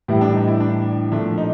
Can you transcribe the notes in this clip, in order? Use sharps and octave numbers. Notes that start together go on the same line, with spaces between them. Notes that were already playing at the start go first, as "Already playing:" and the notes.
A2 E3 G3 E4
D4
D#4
E4
D4
A#2 F3 A3 D4
D#4